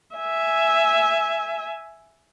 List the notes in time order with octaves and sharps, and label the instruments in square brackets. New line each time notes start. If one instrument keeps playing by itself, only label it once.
[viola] E5 G#5